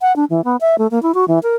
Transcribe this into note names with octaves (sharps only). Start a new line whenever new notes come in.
F#5
D4
E3
B3
E5
A3
A#3
E4
F#4
E3
A#4